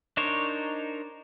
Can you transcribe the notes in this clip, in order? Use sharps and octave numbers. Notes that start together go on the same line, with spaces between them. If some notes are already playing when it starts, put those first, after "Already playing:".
D4 D#4 A#4 C5 C#5